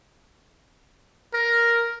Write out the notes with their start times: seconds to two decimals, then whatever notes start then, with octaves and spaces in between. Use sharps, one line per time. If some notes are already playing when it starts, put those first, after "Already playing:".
1.34 A#4